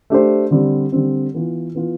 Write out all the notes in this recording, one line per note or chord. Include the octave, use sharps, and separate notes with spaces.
A3 D4 G4 C5
D3 G3 C4
D3 G3 C4
E3 B3 F4
E3 B3 F4